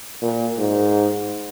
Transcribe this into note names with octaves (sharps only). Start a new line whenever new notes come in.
A#2
G#2